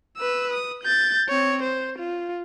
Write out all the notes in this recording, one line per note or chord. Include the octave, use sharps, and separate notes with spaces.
B4 E6
D#6
G6 A6
C4 C#5
C5
F4